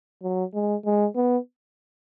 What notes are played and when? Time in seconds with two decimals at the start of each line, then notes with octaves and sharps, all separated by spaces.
0.23 F#3
0.54 G#3
0.85 G#3
1.16 B3